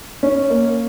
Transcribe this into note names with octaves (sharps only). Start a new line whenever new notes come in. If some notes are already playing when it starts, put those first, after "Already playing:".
C#4
A#3